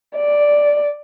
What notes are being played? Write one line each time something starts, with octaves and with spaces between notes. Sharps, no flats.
D5